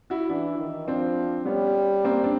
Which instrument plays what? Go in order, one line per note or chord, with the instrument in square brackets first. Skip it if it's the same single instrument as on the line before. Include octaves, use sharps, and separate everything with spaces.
[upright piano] E4 F#4
[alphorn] E3 [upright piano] D4 E4
[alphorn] D#3
[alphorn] F3 [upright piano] C4 D4
[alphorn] G3 [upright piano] B3 C#4
[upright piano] A#3 C4
C4 D4